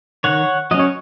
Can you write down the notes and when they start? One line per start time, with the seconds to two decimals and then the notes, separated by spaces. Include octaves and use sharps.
0.24 D#3 C#5 F#5
0.71 F#3 D#5
0.74 C#4
0.79 C#5